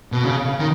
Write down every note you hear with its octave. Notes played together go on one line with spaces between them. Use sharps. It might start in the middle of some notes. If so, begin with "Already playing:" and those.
B2
C#3
D#3